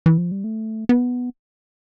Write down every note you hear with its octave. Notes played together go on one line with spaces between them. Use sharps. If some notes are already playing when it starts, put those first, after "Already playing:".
E3
F3
G3
A3
B3